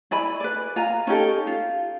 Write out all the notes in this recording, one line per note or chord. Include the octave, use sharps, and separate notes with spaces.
E4 D5 G#5 B5
B4 D5
F4 G#5 A#5
C#4 D#4 G4 A4
F4